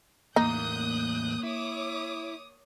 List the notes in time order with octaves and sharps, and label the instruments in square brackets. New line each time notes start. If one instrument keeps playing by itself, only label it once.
[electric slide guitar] E2 A2 [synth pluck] A#3 [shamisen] D#4 [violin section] D#6 F#6 G6
[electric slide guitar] E4 [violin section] C#5 D6 D#6